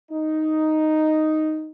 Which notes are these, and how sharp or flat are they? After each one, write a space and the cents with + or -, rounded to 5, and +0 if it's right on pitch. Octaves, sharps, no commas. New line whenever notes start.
D#4 +0